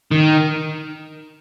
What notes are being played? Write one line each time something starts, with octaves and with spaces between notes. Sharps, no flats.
D#3